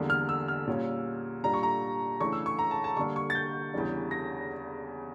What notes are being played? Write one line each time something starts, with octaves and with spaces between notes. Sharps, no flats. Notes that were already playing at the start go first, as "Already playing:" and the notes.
Already playing: E2 D3 G3 A#3
F6
E6
F6
A#2 G3 C#4
A#2 G3 D4 A#5
C#6
A#5
C#3 E3 A3 D4 C#6
E6
C#6
A#5
A5
A5
D3 G3 A#3 D4 C#6
C#6
A6
G6
E2 C#3 E3 G3 D4
A#6